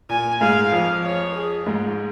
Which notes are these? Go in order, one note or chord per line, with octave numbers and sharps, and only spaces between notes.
A#2 G#5
G#2 G#3 F5
F2 F3
C#5
G#4
G#2 G#3 F4